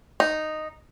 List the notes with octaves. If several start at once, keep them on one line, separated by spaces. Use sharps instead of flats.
D#4